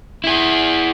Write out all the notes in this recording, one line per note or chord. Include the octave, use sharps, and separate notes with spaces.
E4 G#4